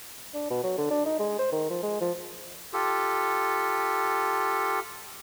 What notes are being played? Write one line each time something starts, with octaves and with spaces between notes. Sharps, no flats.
D4
B2
F#3
D3
D4
D#4
G#3
C5
D#3
F3
G#3
F3
F4 G4 A4